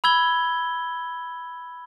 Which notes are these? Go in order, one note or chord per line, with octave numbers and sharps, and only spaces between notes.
B5 E6 G#6 G7